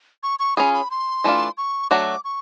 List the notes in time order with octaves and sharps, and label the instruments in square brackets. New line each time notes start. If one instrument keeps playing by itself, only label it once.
[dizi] C#6
C#6
[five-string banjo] C#4 F4 G#4 [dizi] B5
[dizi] B5
C6
[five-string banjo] E3 A3 D4 F4
[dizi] C#6
[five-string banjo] F#3 A3 D4 F#4 [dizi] D6
[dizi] C#6